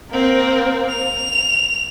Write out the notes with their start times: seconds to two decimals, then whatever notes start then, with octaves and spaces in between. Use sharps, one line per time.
0.11 A#3 C4
0.89 F7